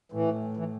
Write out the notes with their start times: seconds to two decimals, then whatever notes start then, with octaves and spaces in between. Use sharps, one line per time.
0.12 A2 E3
0.57 E3